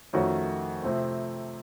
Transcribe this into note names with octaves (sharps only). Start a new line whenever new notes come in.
F2 D#3 A3 C#4 F#4
C3 F3 A3 C4